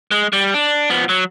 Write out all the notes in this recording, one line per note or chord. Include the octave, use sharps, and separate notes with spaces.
G#3
G3
D4
F3 B3
F#3